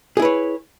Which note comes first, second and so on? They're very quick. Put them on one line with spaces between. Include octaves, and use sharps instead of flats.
G#4 E4 B4 C#5